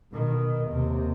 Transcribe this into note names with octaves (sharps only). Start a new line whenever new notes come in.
B2 D#3
D#2 C3